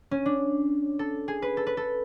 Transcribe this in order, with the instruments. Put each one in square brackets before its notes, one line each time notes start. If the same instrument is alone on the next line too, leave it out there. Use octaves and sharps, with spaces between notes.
[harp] C#4
D4
A4
G#4
B4
A4
B4
A4